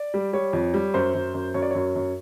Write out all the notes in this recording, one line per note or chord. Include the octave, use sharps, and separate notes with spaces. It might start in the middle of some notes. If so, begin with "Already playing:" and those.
Already playing: D5
G3
G3 C#5
F2
G3
F#2 C5
F#2
F#2
F#2 C#5
D5
F#2 C#5
F#2